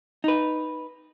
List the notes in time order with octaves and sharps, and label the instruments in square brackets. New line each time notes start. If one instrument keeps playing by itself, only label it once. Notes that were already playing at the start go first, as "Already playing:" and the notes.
[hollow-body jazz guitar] D#4 B4